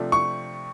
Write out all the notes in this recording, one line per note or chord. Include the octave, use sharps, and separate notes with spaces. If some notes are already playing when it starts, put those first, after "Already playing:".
Already playing: C3 F3 A3 D4
C#6